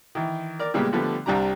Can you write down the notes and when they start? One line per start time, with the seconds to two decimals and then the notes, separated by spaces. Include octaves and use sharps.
0.15 D#3 E3
0.60 A#4 D5
0.74 A#2 C#3 G3 G#3 B3
0.93 D3 F3 G3 A3 B3
1.26 C2 G3 D4 G4 A#5